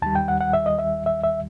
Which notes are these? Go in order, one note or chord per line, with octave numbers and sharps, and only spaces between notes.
D#2 D#3 G3 A5
G5
F#5
F#5
E5
D#5
E5
E5
E5